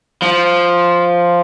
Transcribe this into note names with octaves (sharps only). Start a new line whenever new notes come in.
F3